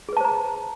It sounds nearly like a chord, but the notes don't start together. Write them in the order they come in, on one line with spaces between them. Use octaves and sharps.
G#4 B4 A5 C5 A#5